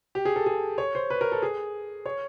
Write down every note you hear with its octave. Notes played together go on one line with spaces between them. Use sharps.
G4
G#4
A4
G#4
C#5
C5
B4
A#4
A4
G#4
C#5